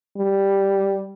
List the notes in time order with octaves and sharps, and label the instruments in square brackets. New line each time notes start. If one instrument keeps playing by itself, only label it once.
[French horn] G3